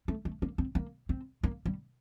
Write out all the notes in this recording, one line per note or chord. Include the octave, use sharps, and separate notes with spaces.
A3
A3
A#3
C4
A#3
C4
A#3
G3